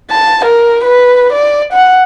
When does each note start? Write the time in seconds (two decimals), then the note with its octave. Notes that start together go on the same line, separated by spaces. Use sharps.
0.10 A5
0.45 A#4
0.84 B4
1.33 D5
1.73 F#5